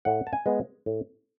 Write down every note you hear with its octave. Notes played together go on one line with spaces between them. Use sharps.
A2 F#5
A5
G#5
G#3 B3
A2